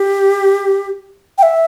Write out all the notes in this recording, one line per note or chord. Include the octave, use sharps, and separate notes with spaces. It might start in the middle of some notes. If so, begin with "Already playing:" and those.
Already playing: G4
G5
E5